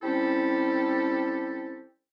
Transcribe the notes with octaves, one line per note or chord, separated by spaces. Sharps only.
G3 C4 C#4 E4 G4 A4